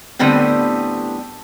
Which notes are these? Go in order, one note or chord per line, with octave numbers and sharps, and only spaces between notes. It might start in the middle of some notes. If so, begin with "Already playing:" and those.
A2 D3 G3 B3 C4 G4